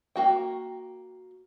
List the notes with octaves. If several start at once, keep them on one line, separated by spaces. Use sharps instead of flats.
A#3 F#4 G5